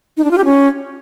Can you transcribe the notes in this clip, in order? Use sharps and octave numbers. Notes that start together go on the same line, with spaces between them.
D#4
D4
F4
G4
C#4